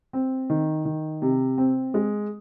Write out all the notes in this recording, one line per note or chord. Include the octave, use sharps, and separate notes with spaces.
C4
D#3
D#3
C3
C4
G#3